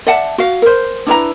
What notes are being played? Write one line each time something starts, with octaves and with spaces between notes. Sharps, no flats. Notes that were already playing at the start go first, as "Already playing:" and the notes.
D5 E5 F#5 A5
F#4 F5
A#4 C5
D4 E4 B4 A#5